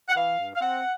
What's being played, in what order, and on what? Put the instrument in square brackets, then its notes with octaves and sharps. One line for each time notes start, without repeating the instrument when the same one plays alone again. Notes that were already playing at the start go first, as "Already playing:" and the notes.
[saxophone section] F#5
E3 F5
G2
F5
C4 F#5